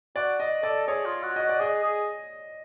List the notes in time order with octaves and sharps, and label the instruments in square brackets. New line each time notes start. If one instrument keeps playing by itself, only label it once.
[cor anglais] F#4 [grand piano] D5
[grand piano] D#5
[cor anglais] A4 [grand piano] D5
[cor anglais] G#4 [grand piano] C#5
[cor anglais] F4
F#4
[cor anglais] F#4 [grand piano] D#5
[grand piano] D5
[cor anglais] G#4 [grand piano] D#5
[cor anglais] G#4